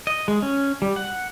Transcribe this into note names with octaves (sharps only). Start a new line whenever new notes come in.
D#5
G#3
C#4
G3
F#5